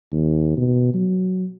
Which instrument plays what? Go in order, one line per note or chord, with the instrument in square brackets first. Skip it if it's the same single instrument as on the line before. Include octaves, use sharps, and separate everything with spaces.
[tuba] D#2
B2
F#3